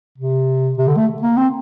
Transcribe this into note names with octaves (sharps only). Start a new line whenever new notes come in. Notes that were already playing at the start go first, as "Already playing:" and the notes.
C3
C3
D3
A3
A#3
C4